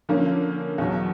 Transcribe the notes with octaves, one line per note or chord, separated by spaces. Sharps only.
D3 F3 A#3 C#4
E2 B2 F#3